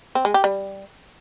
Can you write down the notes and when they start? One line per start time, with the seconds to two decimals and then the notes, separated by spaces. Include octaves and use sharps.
0.15 C4
0.25 G#3
0.34 G4
0.44 G3